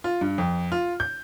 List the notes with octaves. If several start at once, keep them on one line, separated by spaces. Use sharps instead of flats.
F4
G2
F2
F4
G6